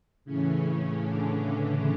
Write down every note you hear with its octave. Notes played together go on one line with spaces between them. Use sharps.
A2 C#3 E3 C#4
D3 D4